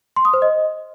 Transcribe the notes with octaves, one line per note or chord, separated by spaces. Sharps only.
C6
D#6
C5
D#5